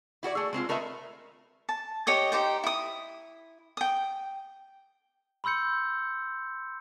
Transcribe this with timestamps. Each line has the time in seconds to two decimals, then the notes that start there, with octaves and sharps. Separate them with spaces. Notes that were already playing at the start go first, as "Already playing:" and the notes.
0.23 E4 F#4 A4 D5
0.35 A3 G#4
0.53 G#3 C4 D#4 F4
0.69 A3 A#4 B4 D#5 E5
1.69 A5
2.07 G4 C#5 D#5 D#6
2.32 D#4 G4 C5 G5
2.64 E4 D#6
3.77 G5 D#6
5.44 B5 C6 E6 G6 C#7